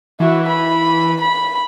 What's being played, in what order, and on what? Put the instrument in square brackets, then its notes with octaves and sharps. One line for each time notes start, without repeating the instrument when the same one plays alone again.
[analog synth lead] E3 [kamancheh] E4 F#4
[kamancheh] B5
B5